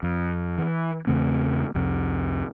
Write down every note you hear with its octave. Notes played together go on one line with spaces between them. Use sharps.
F2
E3
E2 C#3 A3 C4
C2 F2 C3